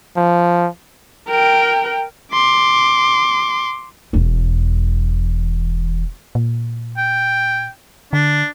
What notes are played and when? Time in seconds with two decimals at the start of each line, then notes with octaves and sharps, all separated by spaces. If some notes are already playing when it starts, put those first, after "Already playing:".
0.16 F3
1.28 A#4 G5
2.33 C6 D6
4.13 E1 E2
6.35 A#2
6.98 G5
8.13 D3 D4